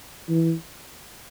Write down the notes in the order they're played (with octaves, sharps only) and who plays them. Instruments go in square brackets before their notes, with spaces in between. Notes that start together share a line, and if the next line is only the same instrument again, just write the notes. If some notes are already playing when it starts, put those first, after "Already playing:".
[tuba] E3